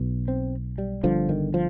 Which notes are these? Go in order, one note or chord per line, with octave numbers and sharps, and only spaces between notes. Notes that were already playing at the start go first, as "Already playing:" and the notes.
Already playing: B1 B2
C4
G3
G1 G2 D3 F3
D#3
F3